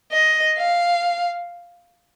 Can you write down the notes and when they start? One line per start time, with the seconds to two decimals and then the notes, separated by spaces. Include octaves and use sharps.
0.12 D#5
0.59 F5